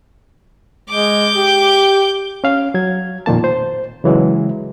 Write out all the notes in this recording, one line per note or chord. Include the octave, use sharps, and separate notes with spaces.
G#3 D6 G6
G4
C#4 F5
F#3 G#6
F2 A#2 D#3 A#3 A5
C5
C#3 E3 F#3 G#3